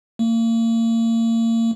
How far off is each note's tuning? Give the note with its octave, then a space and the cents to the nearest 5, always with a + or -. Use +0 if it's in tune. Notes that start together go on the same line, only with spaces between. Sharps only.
A#3 -35